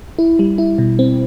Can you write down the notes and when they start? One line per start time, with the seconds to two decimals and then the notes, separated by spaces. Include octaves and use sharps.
0.19 E4
0.39 G3
0.58 E4
0.78 B2
0.99 C4